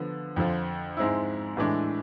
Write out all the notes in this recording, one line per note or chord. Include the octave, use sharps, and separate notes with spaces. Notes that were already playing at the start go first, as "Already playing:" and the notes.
Already playing: D3 F3 B3
F2 D3 F3
G#2 G#3 C4 E4
A2 E3 G#3 D4